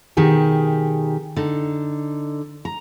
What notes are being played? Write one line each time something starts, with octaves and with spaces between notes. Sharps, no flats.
B2 D#3 G4 G#4
D3 D#4
A#5